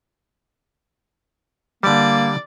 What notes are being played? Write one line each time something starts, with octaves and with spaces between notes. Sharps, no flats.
D3 G3 A#3 D5